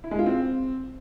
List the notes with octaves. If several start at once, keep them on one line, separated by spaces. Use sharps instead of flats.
E4
G#3
F4
C4